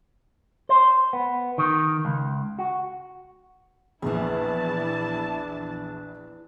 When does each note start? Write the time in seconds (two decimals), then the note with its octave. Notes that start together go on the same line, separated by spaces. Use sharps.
0.69 C5
1.13 B3
1.58 D#3
2.05 C#2
2.59 F#4
4.02 A#1 E2 E3 D4 E4 G#4 A5